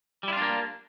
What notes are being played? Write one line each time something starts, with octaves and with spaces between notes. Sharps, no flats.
G3 A#3 D4 E4 F4